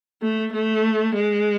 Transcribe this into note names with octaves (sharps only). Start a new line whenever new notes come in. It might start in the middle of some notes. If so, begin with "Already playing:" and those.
A3
A3
G#3